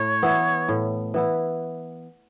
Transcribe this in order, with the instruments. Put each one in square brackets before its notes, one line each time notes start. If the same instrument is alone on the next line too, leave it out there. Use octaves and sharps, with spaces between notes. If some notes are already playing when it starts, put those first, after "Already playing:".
Already playing: [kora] A2 [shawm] C#5
[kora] E3 B3 E4
A2
E3 B3 E4